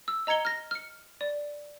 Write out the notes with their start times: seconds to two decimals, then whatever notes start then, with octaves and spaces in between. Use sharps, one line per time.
0.08 E6
0.27 D#5 A#5 G#6 C#7 G7
0.45 F6 A#6
0.71 F6 C#7
1.21 D5